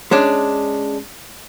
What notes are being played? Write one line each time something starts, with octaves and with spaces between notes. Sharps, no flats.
G#3 C#4 D4